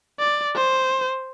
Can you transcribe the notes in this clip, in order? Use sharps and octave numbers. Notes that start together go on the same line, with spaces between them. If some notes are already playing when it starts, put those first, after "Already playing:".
D5
C5